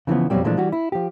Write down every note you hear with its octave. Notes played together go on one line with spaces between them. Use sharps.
C#3 E3 F3 B3
F2 B2 D3 F#3 G3 C4
A#2 E3 F3 G#3 A3 D4
E3 G3 F#4
E4
F3 G4